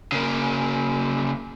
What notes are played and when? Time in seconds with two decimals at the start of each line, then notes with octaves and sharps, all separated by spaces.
0.12 C#3 A#3